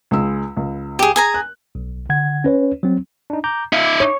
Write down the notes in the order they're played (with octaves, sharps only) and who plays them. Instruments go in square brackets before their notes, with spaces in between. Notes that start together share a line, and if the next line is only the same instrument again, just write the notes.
[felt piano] C#2 G#3 E6
C#2
[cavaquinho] G4 G#4
G#4 G#5 A#5
[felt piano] F#6
[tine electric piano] B1
D3 F#5 G#6
C#4 B4 C#5
F#3 C4
D4 D#4
A#5 D6 G6
[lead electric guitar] D#4 E5 [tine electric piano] F5
[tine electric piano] D6
[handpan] C#5